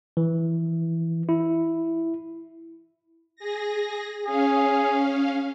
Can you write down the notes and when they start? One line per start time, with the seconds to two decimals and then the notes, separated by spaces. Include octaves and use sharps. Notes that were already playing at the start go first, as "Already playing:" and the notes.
0.17 E3
1.29 E4
3.36 G#4 A#6
4.25 C#4 G#4 F5